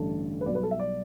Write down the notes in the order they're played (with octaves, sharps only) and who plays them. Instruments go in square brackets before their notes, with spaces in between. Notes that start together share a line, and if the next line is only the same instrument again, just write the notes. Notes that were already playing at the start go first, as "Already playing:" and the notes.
Already playing: [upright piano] A1 G2 D3 A3 A4
B4
B1 B2 G3 D5
B4
A4
E5
D5